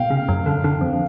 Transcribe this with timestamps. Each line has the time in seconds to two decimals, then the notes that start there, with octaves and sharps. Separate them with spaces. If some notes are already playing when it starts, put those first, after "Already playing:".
Already playing: B2 F5 G5
0.10 C#3
0.29 F#2
0.46 D3
0.64 D3
0.81 F2